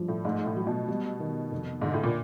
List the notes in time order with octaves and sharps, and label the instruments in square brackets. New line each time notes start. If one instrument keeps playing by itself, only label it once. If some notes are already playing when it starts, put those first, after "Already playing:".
Already playing: [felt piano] G2 F3
[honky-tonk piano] A2
[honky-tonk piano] G#2 [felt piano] A3
[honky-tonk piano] A2
[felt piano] F#3
[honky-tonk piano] B2
[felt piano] G3
D#3
F1
[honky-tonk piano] G#2 [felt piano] D3
[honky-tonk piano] A2
A#2